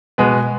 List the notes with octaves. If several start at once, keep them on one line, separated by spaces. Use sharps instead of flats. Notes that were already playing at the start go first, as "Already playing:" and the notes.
B2 G#3 B3